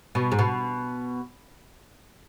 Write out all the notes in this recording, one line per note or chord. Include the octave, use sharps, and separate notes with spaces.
B2
G#2
B2